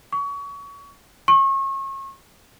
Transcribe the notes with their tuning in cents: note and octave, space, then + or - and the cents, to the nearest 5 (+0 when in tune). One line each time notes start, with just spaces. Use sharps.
C#6 +30
C#6 -35